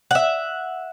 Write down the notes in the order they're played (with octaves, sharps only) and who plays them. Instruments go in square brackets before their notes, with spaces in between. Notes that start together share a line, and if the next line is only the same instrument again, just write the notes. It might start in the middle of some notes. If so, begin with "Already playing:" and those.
[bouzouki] E5 F#5